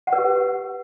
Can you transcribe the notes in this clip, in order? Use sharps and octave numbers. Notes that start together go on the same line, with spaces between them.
F#5
B4
G4